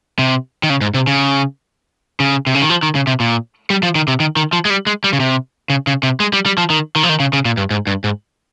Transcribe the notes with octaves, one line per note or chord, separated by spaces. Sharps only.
C3
D#3
C#3
G#2
C3
C#3
C#3
C3
C#3
D#3
F3
D#3
C#3
C3
A#2
G3
F3
D#3
C3
D#3
D#3
F3
G#3
G3
G#3
G3
C#3
C3
C#3
C#3
C3
G#3
G3
G3
F3
D#3
D#3
F3
D#3
C#3
C#3
A#2
G2
G#2
G2
G#2